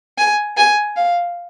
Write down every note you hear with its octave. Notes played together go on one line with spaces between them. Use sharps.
G#5
G#5
F5